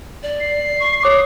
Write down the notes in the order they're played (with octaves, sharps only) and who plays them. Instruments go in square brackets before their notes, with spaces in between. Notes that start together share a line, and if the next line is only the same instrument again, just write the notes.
[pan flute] D5
[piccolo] C7
[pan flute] C#6
[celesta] C#5 D6 [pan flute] D#6